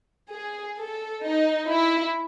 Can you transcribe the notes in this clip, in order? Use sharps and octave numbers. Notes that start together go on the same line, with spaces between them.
G#4
A4
D#4
E4